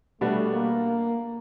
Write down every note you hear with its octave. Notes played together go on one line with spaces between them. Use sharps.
B2 G3 A3 B3 D4 F#4
A#3